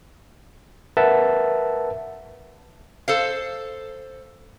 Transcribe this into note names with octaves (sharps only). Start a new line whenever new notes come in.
A#4 B4 E5 F#5 A5
A4 C5 F5